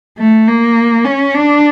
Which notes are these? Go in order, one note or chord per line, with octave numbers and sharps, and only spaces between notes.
A3
A#3
C#4
D4